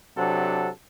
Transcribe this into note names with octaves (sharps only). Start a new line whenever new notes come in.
C3 F#3 C4 D4 A4 F#5